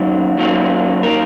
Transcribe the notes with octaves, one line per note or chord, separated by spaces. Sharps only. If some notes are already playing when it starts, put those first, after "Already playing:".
Already playing: F#2 D#3 F#3 A#3
F#2 D#3 F#3 A#3
D#3 A#3 A#4